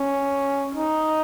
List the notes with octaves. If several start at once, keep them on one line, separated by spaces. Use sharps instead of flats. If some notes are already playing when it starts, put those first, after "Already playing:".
Already playing: C#4
D#4